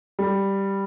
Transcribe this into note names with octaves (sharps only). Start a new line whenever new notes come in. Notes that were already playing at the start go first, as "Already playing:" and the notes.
G3